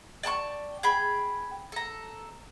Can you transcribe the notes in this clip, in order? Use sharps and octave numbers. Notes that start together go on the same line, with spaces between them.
D5 G5 A5 C#6
G#4 G5 B5
A4 A#5